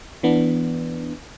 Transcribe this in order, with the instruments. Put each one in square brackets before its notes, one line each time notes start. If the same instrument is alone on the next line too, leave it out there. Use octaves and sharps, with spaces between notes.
[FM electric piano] E3 B3 D4